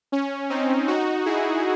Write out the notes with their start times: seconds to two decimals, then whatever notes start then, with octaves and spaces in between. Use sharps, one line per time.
0.12 C#4
0.50 C4 D#4
0.88 D#4 F#4
1.26 E4 G#4